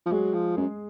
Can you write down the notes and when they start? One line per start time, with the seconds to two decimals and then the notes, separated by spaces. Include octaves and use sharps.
0.06 F3
0.11 F#3 G#3 G#4
0.34 F3
0.57 F#2 G#3 G#4